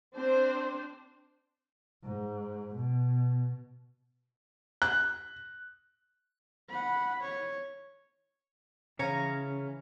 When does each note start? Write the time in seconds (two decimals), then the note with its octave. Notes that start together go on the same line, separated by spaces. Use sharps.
0.15 C4 D4 C5
2.04 G#2
2.76 B2
4.82 F#6
6.70 F#5 B5
7.21 C#5
8.99 C#3 E3 C#4 C#5 F5 A#5